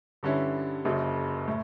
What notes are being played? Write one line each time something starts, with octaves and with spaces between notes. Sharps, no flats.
G2 D3 G3 C#4 E4
F#1 F#2 C#3
A2